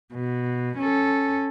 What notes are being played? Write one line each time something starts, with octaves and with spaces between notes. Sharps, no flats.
B2
C#4 A4